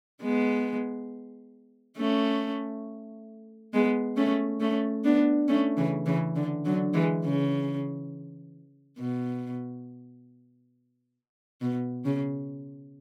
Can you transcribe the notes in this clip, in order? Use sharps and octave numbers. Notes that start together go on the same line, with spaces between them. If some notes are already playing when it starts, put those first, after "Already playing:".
G#3 B3
A3 C#4
G#3 B3
A3 C#4
A3 C#4
B3 D4
A3 C#4
C#3 E3
C#3 E3
D3
D3 F#3
E3 G#3
C#3
B2
B2
C#3